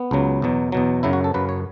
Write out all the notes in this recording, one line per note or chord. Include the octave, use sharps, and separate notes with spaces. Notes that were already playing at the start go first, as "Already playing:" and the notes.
Already playing: B3
C#2 C#3 F#3
E2 B2 F#3
E2 B2 F#3
F#2 C#3 F#3 E4
F#4
A4
F#2 C#3 F#3 B4
C#5